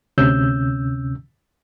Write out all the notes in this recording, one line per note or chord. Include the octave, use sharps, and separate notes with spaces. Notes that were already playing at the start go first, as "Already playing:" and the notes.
D2 C3 C#4 E6 G6